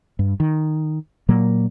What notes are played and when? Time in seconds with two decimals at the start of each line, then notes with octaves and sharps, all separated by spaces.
0.19 G2
0.40 D#3
1.29 A#2 F#3 A#3